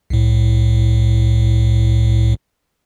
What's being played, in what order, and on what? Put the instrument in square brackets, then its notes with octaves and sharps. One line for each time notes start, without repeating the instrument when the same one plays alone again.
[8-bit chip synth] C2 A2